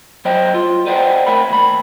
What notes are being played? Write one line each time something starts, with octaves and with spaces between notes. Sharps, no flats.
F#3 C5 D#5 G5
F4
B4 C5 D5 D#5 F#5 G5
A3 A#4 G5 B5
D#2 B5